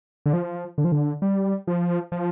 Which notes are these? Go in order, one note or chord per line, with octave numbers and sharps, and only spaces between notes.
D3
F3
D3
F3
D3
G3
F3
F3